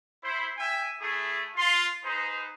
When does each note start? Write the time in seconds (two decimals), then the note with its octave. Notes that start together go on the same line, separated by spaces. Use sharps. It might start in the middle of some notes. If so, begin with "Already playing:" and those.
0.23 E4 C5
0.58 E5 G5 G#5
1.00 A3 E4 G#4
1.57 F4 C6
2.04 D#4 G#4 B4 C5